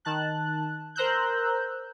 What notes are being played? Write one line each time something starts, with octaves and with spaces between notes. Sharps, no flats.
D#3 A5 F#6
A#4 C5 A#5 E6 F#6 G6